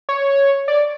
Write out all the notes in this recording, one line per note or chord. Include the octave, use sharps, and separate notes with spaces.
C#5
D5